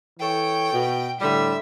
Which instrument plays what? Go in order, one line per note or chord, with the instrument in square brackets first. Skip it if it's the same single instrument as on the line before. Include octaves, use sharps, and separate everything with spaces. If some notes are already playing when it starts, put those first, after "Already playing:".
[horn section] E3 A4 C#5 [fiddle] G5
[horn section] B2
[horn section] A2 D3 G3 [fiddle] E5